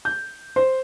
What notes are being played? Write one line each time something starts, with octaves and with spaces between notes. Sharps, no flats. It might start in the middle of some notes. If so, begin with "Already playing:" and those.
G6
C5